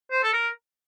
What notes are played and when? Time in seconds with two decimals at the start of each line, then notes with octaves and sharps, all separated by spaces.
0.11 C5
0.23 A4
0.33 A#4